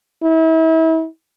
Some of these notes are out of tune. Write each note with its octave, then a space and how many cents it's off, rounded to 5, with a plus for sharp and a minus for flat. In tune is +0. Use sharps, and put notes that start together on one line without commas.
E4 -35